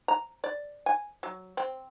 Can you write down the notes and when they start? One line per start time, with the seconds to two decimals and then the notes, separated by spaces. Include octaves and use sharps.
0.08 A#5
0.44 D5
0.86 G#5
1.23 F#3
1.57 C4